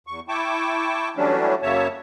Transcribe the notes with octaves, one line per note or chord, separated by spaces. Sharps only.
E2 C#6
E4 G5 A5 C#6 D6
E3 F#3 G3 A3 C#4 D4
F#2 C#3 A#3 C#5 E5 A5